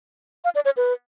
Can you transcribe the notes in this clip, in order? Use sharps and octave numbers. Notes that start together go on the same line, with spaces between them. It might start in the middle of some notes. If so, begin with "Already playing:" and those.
F5
D5
C#5
B4